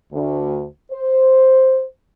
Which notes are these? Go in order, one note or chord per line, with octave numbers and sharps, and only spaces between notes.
D2
C5